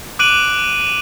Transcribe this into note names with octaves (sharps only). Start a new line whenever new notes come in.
D6 F#6 D7 D#7 F#7